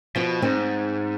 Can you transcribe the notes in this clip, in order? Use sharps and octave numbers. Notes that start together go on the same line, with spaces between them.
B2 F3
G#2 C4